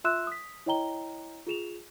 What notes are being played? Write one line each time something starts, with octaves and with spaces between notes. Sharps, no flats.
F4 E5 C6 E6 F#6 E7
D#6 B6
E4 C#5 D#5 G5 A#5 G7
F4 G#4 E7 F7